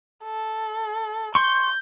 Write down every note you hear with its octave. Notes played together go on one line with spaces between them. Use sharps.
A4
C6 C#6 G6